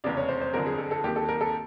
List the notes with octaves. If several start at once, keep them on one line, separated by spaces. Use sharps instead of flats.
F1 E2 C#3 D5
C#5
C5
C5
G1 F2 D3 A#4
G#4
A4
A4
D#2 D#3 G4
A4
A#4
A4